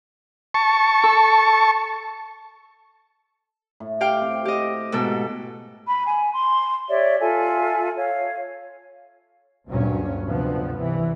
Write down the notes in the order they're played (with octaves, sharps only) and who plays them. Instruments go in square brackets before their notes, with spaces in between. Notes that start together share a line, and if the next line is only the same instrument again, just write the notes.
[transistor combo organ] A5 C#6
[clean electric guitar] A4
[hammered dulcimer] A2
[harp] G4 F5 G5
[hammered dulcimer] C4
[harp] G4 D#5
G#2 B2 A4
[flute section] B5
G#5
C6
G4 C#5 D5 E5
F4 A4 E5 G#5
C#5 F5
[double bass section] D2 G2 A#2 F#3 C#4
D2 G2 C3 F3 B3
C2 E3